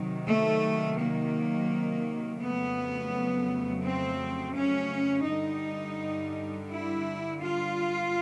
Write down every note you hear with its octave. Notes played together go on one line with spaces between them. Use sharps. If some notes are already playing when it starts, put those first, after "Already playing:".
Already playing: C3 D#3 F#3
A3
A#3
F2 C#3 F#3 A3 B3
C4
C#4
G2 D3 G3 D#4
E4
F4